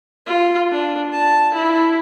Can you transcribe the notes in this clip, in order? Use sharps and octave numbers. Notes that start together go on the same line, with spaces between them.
F4
D4
A5
E4